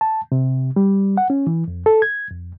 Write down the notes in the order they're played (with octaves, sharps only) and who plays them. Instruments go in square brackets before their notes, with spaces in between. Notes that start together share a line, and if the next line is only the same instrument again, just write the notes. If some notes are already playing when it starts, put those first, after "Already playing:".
[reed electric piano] A5
C3
G3
F#5
C#4
E3
F2
A4
G#6
F2